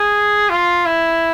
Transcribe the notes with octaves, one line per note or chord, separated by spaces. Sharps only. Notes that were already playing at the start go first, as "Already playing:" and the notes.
Already playing: G#4
F4
E4